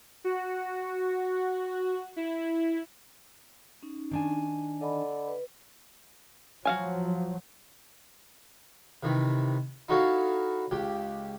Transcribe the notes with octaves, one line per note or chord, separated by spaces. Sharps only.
F#4
E4
C#4 D#4
D#3 D4 G#5
D3 D#5 B5
B4
F3 F#3 F#4 F5 G#5
C3 D#3 E3
D#4 E4 F#4 A4 C#5 F5
C#2 G4